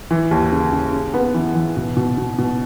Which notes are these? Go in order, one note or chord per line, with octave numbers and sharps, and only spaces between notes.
E3
D#2
C#3
C#3
C#3
B3
E3
E3
B2
B2
B2
B2